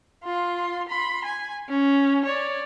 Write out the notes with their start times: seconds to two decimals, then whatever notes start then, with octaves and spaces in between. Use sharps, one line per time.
0.24 F4 C6
0.88 B5 C6
1.25 G#5
1.69 C#4
2.25 C#5 D5